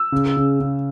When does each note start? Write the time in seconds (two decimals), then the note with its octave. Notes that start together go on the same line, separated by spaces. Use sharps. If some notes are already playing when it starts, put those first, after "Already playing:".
Already playing: E6
0.12 C#3
0.37 C#3
0.60 C#3